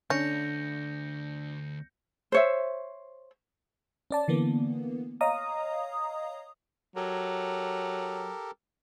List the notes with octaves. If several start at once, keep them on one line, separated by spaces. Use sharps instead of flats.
D2 D3 C#4 G6 A#6 C#7
C5 C#5 E5
C#4 D5 A5
D3 E3 A#3 B3
C#5 D#5 F5 A#5 D#6
F#3 G4 A4 A#4